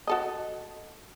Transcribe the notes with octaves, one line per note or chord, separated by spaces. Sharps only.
F#4 A4 D#5